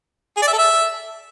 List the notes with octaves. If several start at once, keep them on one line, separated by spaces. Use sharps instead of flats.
G#4
D5
E5
A4
E5